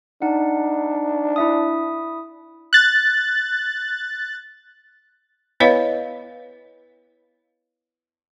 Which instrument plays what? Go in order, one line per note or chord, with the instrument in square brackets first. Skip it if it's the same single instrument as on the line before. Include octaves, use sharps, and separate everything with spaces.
[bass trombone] D4 [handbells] D#4 F#5
[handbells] E4 E5 D#6
[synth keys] F#6 A6
[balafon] B3 E4 B4 C#5 D#5 F5